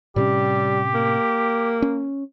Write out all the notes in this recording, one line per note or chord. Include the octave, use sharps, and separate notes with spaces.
A2 C3 G3 C#4 G4
A#3
C#4